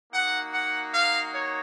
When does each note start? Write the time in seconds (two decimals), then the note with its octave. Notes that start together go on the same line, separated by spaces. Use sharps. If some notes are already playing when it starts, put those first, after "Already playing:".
0.11 A#3 D#4 F#4 F#5
0.51 F#5
0.92 F5
1.33 C#5